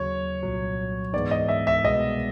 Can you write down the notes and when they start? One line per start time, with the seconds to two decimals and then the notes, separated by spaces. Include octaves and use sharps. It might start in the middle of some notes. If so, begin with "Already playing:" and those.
Already playing: D#2 C#3 F#3 C#5
0.43 C2 A#2 F#3
1.13 G#2 E3 G#3 B3 D#4 D5
1.31 D#5
1.48 E5
1.67 E5
1.84 C2 B2 G#3 B3 D#5